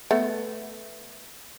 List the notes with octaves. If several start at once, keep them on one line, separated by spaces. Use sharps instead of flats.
A3 B3